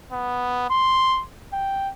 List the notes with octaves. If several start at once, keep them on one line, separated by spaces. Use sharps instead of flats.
B3
C6
G5